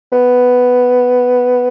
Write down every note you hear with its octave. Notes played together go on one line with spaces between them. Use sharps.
B3